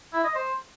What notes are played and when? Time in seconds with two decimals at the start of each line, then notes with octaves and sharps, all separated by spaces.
0.13 E4
0.24 D#5
0.35 C5